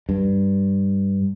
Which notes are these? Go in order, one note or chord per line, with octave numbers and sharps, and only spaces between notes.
G2